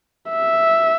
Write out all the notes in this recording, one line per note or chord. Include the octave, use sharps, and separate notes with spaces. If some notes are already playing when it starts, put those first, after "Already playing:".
E5